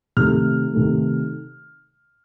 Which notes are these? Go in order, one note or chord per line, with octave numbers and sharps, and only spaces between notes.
C3 D#3 A3 F6
C3 D#3 A3